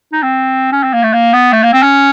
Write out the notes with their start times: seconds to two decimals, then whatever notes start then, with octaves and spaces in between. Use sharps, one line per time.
0.13 D#4
0.23 C4
0.72 C#4
0.83 C4
0.93 A#3
1.03 A3
1.13 A#3
1.33 B3
1.53 A3
1.63 A#3
1.73 C4
1.82 C#4